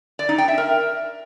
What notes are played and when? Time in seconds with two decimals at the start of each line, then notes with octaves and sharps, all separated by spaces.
0.19 D5
0.29 D#4
0.38 G5
0.48 E5
0.58 A#4